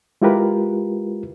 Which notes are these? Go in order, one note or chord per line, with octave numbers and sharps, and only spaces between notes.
G#3 E4 F4 G4 A#4 B4